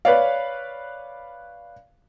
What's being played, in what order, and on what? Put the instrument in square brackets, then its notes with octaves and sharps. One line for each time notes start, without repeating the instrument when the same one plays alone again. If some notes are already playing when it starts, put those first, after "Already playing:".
[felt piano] B4 C#5 D5 F5